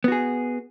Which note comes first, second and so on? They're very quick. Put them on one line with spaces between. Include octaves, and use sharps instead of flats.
B3 F#4 G#4